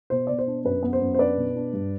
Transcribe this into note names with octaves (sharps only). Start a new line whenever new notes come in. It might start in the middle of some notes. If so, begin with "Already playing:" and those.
B2 C5
B2 D5
C5
D4
F#2 B4
B3
C5
F#2
C5
D4 B4 D5
B2
D4
G2